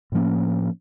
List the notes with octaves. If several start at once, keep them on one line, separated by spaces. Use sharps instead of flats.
A2 F3 A#3 C#4